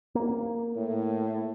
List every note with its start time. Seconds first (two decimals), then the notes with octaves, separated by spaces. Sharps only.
0.15 A#3
0.75 A2